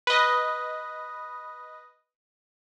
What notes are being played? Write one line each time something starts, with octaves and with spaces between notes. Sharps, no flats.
B4 D#5